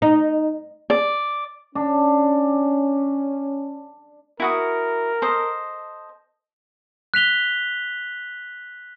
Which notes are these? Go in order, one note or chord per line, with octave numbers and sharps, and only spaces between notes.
D#4
D5
C#4 D4
E4 F#4 A#4 D#6
A4 C5 D#5
F#6 B6 F7 G7